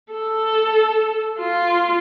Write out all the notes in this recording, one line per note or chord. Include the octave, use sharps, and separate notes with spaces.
A4
F4